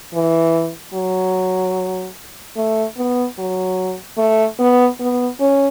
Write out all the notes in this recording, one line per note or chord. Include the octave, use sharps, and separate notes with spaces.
E3
F#3
A3
B3
F#3
A3
B3
B3
C#4